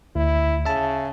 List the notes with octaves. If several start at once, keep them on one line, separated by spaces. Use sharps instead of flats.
D2 E4
C#3 E5 A5